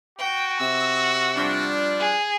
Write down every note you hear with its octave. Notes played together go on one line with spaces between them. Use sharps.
F#4 G5
C3 E6
F3 G3 D4
G#4